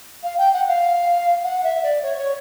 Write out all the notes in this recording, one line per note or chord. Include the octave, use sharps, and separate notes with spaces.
F5
G5
F#5
F5
F#5
E5
D5
C#5
C#5